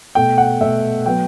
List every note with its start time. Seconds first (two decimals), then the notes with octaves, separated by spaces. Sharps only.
0.15 B2 A3 G5
0.38 F#5
0.61 B2 A3 E5
1.06 F#3 B3 G5